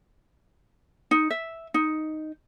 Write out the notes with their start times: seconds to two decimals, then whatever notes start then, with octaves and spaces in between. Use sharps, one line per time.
1.11 D#4
1.30 E5
1.74 D#4